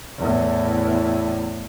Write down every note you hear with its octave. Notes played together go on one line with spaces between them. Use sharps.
E2 A2